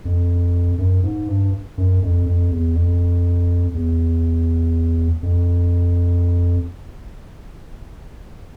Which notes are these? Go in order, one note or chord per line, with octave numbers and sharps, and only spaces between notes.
F2
F#2
G#2
G2
F#2
F2
F2
E2
F2
E2
F2